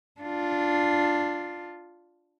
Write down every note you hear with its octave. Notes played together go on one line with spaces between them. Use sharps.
D4 F4